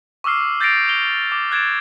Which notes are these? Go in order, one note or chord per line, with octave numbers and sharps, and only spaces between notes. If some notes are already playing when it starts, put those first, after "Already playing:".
C#6 D6 E6 F6 C7
G6 A6 A#6 C7 D7 F7
F7 G7
D6
F#6 G#6 A6 D7 E7